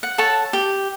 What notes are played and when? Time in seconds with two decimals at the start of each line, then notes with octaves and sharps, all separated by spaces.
0.03 F#5
0.18 A4 C#5 F#5 A5
0.53 G4